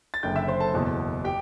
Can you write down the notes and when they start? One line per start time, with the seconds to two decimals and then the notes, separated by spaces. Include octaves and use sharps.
0.14 A6
0.23 F#1 F#2 D3 G5 G6
0.35 E5 E6
0.48 C5 C6
0.60 A4 A5
0.73 F#1 E2 B2
1.25 G4 G5